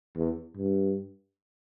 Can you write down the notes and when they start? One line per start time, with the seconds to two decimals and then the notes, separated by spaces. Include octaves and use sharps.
0.16 E2
0.57 G2